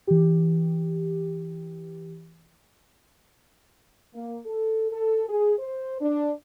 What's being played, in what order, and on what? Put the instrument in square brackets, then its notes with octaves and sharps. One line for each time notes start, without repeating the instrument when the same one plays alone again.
[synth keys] E3 G4
[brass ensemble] A#3
A4
A4
G#4
C5
D4